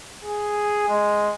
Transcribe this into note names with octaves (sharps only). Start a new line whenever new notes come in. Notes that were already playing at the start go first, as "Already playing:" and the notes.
G#4
G#3